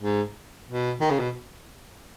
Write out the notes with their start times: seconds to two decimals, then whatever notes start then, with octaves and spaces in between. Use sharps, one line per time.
0.01 G#2
0.71 B2
1.01 D#3
1.10 C#3
1.19 B2